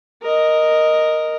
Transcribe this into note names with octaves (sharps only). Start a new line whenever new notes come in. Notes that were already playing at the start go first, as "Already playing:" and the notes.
A#4 D#5